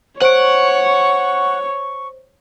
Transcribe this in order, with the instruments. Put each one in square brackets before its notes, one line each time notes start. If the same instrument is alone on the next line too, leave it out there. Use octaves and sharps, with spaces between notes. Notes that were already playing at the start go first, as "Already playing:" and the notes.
[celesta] C5 D7 [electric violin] C#5 [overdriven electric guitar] F#5 [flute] C#6